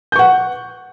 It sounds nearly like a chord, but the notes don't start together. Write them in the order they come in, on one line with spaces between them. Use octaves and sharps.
G6 C#6 F#5